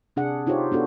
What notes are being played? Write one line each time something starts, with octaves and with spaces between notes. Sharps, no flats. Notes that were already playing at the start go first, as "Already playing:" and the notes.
C3 D4 G#4 F#5
D#4 F4 G4 C5 C#5
B3 D4 F#4 A4